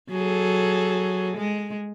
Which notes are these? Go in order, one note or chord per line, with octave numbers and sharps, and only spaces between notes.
F#3 G#4 A4
G#3